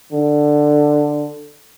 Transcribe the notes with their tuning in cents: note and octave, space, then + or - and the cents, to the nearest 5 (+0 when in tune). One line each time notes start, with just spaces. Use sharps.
D3 +10